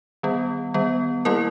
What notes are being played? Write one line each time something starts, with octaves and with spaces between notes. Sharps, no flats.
D#3 G3 B3
D#3 G3 B3
D#3 G3 A#3 E4 A#4